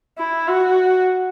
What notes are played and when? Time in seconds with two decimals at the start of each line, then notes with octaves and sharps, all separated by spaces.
0.18 E4
0.48 F#4